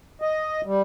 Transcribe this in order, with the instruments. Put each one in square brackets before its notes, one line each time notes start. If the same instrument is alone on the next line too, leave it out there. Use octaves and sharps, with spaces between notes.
[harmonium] D#5
G3